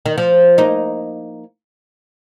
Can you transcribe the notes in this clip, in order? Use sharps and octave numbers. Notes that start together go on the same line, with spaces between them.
D#3
F3
A#3 D#4